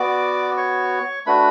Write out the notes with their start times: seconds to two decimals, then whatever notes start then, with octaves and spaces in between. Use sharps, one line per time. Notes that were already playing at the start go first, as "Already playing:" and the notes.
Already playing: B3 F#4 D5 D6
0.57 C#5 C#6
1.26 A3 D4 F#4 B4 B5